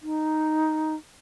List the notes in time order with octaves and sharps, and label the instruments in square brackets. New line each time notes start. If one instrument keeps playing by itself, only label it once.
[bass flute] D#4